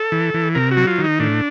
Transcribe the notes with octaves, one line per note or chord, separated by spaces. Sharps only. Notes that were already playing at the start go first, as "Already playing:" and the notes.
Already playing: A4
E3
E3
C3 A#4
F#4
F#3
F4
D#3
D#4
A2 D4